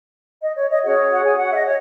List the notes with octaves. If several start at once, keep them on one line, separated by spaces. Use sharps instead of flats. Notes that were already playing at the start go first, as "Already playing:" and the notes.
D#5
C#5
D#5
C#4 F#4 G#4 C#5 F#5
F#4 F#5
G#4 G#5
F#4 F#5
E5
D#5
C#5